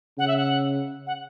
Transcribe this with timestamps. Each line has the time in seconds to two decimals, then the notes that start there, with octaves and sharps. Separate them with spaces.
0.18 C#3 F#5
0.28 E5
0.37 F#5
1.07 F#5